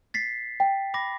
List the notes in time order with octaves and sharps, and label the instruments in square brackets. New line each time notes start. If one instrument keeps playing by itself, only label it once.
[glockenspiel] A6 B6 C7
[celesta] G5
[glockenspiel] B5 D6 A#6